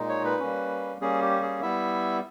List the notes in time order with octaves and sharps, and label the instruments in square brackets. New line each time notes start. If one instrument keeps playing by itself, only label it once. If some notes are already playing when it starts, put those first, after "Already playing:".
Already playing: [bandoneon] A#2 G#3 D#4
C#5
B4
G3 A#3 C#4
G3 A#3 C#4 G#4
G4
G#4
G3 B3 E4 E5